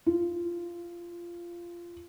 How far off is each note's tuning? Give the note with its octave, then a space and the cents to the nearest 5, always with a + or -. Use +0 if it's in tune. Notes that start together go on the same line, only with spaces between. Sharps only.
F4 -15